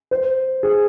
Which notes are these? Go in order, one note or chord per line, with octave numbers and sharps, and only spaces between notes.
C5
G#4